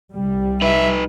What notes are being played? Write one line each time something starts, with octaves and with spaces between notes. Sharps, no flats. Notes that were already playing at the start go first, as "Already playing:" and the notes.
C2 G3
D#4 B4 E5